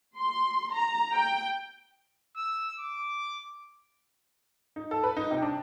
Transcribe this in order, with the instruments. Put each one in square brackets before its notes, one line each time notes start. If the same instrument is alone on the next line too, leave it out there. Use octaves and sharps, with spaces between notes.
[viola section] C6
A#5
G5
[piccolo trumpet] E6
D6
[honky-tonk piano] D#4
A4
B4
D#4
C3
D4